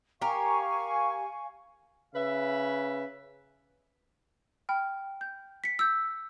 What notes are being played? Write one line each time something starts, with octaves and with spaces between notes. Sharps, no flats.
G4 A#4 F5 G#5 C#6
C#3 B4 E5
G5 B5 F6
G6
B6 C#7
E6 G6